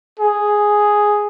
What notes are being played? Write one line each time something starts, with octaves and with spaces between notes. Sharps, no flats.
G#4